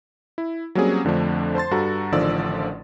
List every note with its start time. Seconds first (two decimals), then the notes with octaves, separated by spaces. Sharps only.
0.38 E4
0.75 F#3 G3 A#3 C4 C#4 G#4
1.05 F2 D3 F3 A3 D4
1.55 C5 A5 C6 A6
1.71 G2 F#4 A4 A#5
2.12 A1 D3 D#3 F3 D5 E6